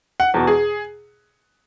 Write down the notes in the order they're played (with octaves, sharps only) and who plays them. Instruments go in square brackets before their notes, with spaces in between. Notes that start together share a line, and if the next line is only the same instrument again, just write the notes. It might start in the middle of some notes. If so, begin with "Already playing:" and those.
[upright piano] F#5
E2 B2
G#4